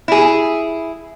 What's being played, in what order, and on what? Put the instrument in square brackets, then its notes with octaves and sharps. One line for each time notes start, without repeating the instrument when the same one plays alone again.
[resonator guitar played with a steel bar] E4 G#4